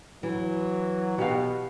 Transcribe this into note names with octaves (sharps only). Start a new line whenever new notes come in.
E3 F#3
B2 F#4 G4 F5